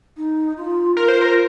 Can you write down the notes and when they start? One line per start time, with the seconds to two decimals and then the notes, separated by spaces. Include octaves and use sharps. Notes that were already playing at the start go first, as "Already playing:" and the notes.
0.17 D#4
0.57 F4
0.96 F4 A#4
1.08 C5
1.21 A#4